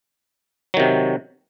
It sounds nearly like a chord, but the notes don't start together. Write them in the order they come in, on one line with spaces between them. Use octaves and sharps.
F#3 D#3 C3